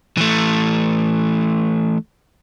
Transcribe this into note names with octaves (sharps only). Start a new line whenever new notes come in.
E3 A3